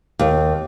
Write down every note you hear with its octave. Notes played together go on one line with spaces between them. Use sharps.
D#2